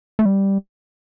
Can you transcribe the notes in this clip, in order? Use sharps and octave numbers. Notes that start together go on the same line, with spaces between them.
A3
G3